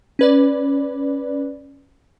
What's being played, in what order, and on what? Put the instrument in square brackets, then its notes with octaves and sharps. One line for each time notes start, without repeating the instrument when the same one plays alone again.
[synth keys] C#4 B4 D5